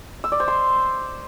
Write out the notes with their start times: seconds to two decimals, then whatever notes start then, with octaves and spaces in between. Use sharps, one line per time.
0.24 E6
0.32 D5
0.40 C5
0.48 C6